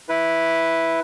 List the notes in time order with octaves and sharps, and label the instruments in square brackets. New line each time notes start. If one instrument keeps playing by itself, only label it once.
[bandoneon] E4 B4